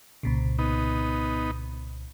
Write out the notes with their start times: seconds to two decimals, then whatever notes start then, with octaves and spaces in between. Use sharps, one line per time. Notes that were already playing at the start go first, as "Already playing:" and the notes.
0.23 C2 A#2 C#3
0.59 B3 D#4